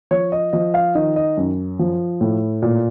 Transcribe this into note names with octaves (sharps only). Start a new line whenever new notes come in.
F3 C#5
D#5
F3 D#5
F5
D#3 D#5
D#5
F#2
F3
A2
A#2